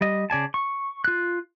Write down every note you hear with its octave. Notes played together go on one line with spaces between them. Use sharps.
G3 D#5
C#3 D5 G#5 A5
C#6
F4 F#6